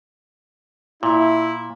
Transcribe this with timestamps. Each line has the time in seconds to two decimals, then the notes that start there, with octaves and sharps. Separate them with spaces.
1.03 A#2 E4